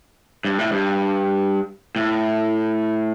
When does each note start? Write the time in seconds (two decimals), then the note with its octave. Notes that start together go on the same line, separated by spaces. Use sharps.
0.45 G2
0.58 A2
0.72 G2
1.96 A2